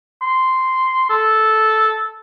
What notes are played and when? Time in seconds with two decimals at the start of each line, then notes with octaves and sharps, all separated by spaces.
0.22 C6
1.10 A4